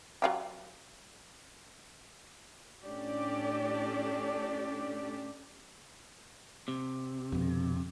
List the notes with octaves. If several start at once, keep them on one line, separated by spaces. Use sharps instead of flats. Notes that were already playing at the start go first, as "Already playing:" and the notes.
F#3 F4 G4
A2 C#4 D4 G4 A4 D5
C3
F2 B2 D3